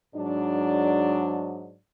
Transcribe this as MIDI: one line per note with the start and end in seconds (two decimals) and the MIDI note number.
0.16 1.77 44
0.16 1.77 54
0.16 1.77 62